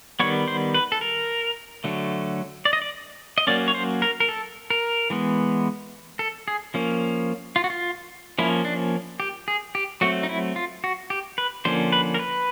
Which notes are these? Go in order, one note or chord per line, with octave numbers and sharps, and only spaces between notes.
D#3 G3 B3 C#5
C5
B4
A4
A#4
D3 F#3 A3
D5
D#5
D5
D#5
F#3 A#3 C#4 D5
C#5
C5
A#4
A#4
A4
A#4
E3 G#3 B3
A4
G#4
F3 A#3 C#4
F4
F#4
F4
F3 A#3 C#4 E4
D4
G4
G#4
G4
F#3 A3 C4 F#4
D#4
E4
F4
F#4
G4
B4
D3 F3 A#3 C#4 C5
B4
A#4
B4